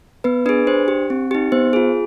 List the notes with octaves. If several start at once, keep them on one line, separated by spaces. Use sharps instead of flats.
B3 B4
D4 G#4 B4
D4 C5
G4
C4
D#4 G4
B3 C5
F4 G#4